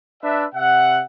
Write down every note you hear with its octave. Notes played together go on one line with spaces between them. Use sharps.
D4 B4 E5
C3 E5 F#5